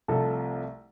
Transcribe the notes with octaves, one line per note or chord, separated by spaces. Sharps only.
C2 C3 F3 A3 A4